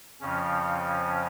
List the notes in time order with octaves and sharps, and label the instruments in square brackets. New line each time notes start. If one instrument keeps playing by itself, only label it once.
[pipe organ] F2 C#3 F3 C#4